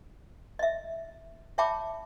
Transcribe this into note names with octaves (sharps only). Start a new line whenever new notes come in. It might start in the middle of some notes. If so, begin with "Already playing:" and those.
D#5 E5
C#5 E5 G5 A5 B5 D6